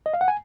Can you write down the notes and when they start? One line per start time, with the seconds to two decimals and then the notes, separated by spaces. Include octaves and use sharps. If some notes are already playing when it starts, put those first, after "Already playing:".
0.06 D#5
0.14 F5
0.21 F#5
0.28 G#5